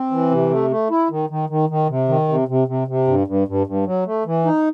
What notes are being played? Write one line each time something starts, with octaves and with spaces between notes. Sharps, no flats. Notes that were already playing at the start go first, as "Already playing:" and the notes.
Already playing: C4
E3
C3
A3
A3
E4
D#3
D#3
D#3
D#3
C3
D#3
C3
C3
C3
C3
G2
G2
G2
G2
F#3
A3
E3
D#4